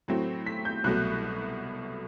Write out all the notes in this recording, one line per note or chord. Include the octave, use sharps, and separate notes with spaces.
A2 F#3 A3 C4
B6
G6
C2 B2 F#3 A3 F#6